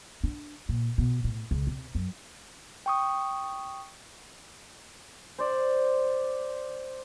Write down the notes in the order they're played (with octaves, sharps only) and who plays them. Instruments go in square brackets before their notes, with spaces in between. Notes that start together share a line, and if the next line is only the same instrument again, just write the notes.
[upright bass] D4
A#2
B2
A2
C#2
C3
F#2
[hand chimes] G5 C#6 D#6
[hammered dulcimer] C5 D5